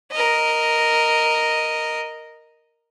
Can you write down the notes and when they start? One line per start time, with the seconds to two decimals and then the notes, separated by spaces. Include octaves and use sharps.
0.12 A#4 D#5